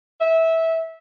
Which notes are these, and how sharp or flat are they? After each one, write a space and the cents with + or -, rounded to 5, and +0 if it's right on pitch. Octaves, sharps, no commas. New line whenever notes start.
E5 -15